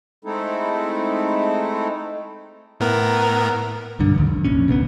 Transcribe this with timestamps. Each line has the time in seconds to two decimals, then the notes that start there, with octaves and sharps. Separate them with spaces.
0.25 G#3 A3 C4 D#4 E4 A4
2.80 A2 B3 A#4
3.99 B1 G2 D3
4.15 A1 D#2
4.27 F2
4.45 F1 A#1 C#4
4.68 D2 A#2 A#3 B3